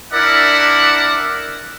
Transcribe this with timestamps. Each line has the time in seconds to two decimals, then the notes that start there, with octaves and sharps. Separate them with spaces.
0.12 D4 E4 A#4 D5 E5 F#5